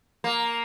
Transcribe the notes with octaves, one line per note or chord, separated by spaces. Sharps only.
A#3